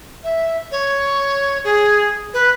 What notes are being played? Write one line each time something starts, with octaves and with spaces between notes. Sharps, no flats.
E5
C#5
G#4
B4